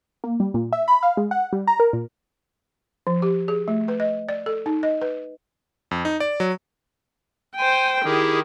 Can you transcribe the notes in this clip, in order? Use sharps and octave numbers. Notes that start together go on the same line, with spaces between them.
A#3
G3
A#2
E5
B5
F5
G#3
F#5
G3
A#5
A#4
A#2
F3
G4
G#4
A3
B4
D#5
D5
A4
D#4
D#5
B4
F2
D#4
D5
F#3
C5 G5 G#5
D#3 E4 G4 G#4